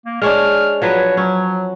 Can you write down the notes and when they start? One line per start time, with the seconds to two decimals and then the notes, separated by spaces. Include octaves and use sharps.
0.06 A#3
0.22 G#3 C#4 D4 F6
0.82 F3 F#3 B4 C#5
1.17 F#3 C#4